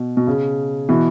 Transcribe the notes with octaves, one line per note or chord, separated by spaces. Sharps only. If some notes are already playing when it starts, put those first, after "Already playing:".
Already playing: B2
B2
C#3
B2 E3